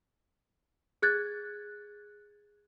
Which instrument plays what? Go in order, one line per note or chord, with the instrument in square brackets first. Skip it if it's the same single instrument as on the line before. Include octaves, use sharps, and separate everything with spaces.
[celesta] G#4 F#6 G#6 A6